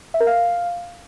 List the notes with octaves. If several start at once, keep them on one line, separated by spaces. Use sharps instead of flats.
E5
A#4
F5